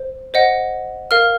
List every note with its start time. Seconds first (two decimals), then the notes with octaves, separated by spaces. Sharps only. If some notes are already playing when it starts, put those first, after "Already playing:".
Already playing: C5
0.34 C5 D#5 F#5
1.11 A#4 F5 F6